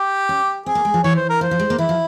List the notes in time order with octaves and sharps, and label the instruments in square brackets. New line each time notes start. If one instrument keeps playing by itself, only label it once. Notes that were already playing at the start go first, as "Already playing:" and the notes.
Already playing: [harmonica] G4
[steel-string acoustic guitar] C#4
[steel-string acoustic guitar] C4 [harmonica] G#4
[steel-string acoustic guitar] A#3
G#3
F3
[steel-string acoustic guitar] E3 [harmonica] C#5
[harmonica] C5
A#4
[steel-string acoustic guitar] F3 [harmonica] C5
[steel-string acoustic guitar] F3
G#3
A#3
[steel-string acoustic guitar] E3 [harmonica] E4
[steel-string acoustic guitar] F3